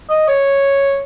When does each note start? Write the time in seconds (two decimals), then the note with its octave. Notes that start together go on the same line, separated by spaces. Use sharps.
0.10 D#5
0.28 C#5